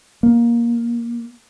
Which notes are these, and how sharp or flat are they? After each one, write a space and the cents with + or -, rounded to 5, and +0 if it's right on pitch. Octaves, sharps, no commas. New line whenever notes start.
A#3 +15